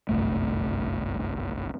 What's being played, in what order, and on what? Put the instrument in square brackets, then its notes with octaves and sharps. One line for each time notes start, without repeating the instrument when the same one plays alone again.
[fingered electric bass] G1 C2 F#2 A3